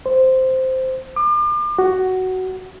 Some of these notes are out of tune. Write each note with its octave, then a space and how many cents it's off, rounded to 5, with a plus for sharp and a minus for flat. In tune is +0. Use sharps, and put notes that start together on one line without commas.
C5 -5
D6 +35
F#4 +10